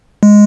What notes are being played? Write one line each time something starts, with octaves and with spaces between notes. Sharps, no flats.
G#3